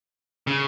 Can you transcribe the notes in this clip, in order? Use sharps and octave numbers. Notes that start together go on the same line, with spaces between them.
C#3